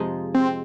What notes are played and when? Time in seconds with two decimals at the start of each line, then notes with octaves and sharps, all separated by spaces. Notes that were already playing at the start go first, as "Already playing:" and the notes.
Already playing: F2 C3 F3 G#3 D#4
0.35 C4